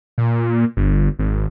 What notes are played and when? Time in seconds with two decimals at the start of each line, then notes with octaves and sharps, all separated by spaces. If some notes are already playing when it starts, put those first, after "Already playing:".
0.18 A#2
0.77 G1
1.19 G#1